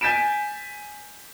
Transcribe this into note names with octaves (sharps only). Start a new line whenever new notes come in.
G#5 G6 A6 B6 D7 E7